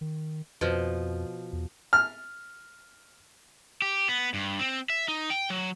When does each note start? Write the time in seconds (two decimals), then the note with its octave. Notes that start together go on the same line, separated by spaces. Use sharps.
0.01 D#3
0.61 F2 B2 F3
1.53 E2
1.93 F6
3.82 G4
4.09 B3
4.34 G2
4.59 C4
4.90 E5
5.08 D#4
5.30 G5
5.50 F#3